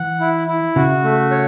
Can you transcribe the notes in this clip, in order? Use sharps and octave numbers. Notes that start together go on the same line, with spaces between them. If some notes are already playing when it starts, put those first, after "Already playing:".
Already playing: E3 F#5
E4
E4
C#3 F#4
A3
C#5